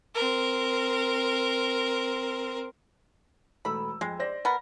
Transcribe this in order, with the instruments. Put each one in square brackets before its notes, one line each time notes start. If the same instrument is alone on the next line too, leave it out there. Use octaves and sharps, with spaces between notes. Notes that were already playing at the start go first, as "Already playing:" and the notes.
[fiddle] C4 A#4
[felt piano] E1 A3 E6 [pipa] B5
[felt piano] F2 [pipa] G#3
[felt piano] C5 D5 A#6
[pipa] B3 A#4